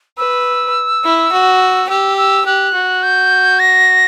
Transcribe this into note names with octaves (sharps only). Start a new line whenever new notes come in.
B4 E6
E4
F#4
G4 E6
E6
G4 F#6
F#4
G6
A#6